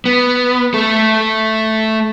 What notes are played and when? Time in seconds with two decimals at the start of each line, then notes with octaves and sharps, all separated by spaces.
0.06 B3
0.74 A3 A4